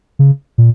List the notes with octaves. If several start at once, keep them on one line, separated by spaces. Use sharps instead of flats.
C#3
A#2